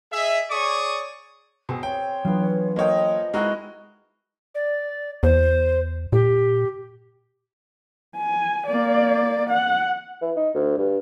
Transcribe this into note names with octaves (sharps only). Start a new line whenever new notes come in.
G#4 D#5 E5
G#4 C#5 D5 C#6 D#6
B2 C4 G#4 C5
C#5 G5
E3 F#3 B3 D4 F4
F3 A#3 C#5 D#5 G5
G#3 D#4 E4 F#4 A#4
D5
E2 C5
A#2 G4
G#5
A#3 D5
F#5
E3
D#4
D2
G2